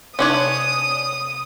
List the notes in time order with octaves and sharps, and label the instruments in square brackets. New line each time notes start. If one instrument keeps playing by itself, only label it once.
[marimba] C3 D6 [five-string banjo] C#4 D4 C#5 [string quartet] D#6